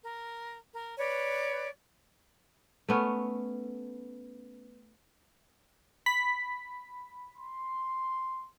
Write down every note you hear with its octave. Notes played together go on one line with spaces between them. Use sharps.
A#4
A#4
B4 C#5 D5
A3 B3 C#4
B5 B6
C6